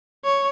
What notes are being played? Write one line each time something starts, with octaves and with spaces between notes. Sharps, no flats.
C#5